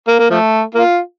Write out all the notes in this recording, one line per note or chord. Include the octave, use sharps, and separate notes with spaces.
A#3
A#3
F3 A3
A#3 F4